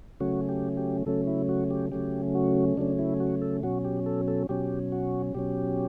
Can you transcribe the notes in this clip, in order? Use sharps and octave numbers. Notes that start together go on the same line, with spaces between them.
C#3 F#3 A3 C#4 F#4
G4
G4
C#3 F#3 A3 C#4 A4
E4
F#4
G4
C#3 F#3 A3 C#4 G4
F#4
C#3 F#3 A3 C#4 D4
E4
F#4
A4
B2 F#3 C#4 F#4
G4
A4
A4
B2 F#3 C#4 G4
F#4
B2 F#3 C#4 G4